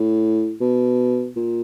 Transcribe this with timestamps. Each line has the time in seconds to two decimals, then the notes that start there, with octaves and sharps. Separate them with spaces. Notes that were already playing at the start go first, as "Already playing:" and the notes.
Already playing: A2
0.61 B2
1.36 A#2